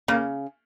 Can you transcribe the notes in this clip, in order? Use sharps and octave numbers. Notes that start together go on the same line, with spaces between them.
C#3 A#3